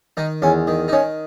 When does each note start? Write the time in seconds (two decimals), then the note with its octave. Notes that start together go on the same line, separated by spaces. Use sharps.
0.17 D#3 D#4
0.42 E2 C#4
0.67 D#3
0.88 D#4
0.92 D#3 C#4